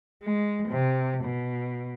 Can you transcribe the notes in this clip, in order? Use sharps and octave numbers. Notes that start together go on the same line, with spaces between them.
G#3
C3
B2